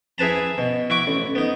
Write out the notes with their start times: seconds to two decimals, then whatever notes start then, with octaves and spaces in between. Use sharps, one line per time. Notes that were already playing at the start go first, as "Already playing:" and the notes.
0.18 E4 G#4 B4 A5 A#5
0.58 B2
0.90 E4 F#4 C#6 D6
1.07 A1
1.35 B3 D#4